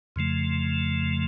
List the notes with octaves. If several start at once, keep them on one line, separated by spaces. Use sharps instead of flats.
F2 C#3 F3 A3